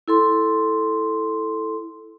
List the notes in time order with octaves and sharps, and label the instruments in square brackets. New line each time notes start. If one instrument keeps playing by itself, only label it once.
[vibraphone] E4 A4 C6